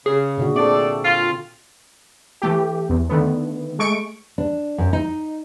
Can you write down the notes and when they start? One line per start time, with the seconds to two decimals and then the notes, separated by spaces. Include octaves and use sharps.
0.06 C#3 G#4
0.38 A#2 D3 F#4
0.56 A3 C4 A4 D5
1.04 F4
2.42 E3 A3 G4
2.89 E2
3.09 D3 D#3 A3 B3
3.79 G#3 A3 C#6 D7
4.38 D4
4.78 F#2
4.93 D#4